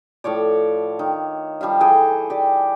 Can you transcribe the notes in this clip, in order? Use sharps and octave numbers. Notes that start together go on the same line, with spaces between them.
A2 F3 C#5 D5
D#3
F3 G3 E5 F5
E3 G#4 A4 G5
G4 D5